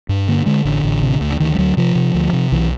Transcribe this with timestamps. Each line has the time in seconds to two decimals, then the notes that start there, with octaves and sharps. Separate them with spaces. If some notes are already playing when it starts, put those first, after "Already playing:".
0.09 G2
0.28 D3 A#3
0.46 D3 G#3
0.65 A1 D3
0.84 A1
1.03 C3
1.21 D2
1.33 D3
1.40 D2 D#3
1.55 G3
1.58 D2 F#3
1.77 C3 F3
1.95 C3
2.15 D2
2.33 C3
2.52 B1 E3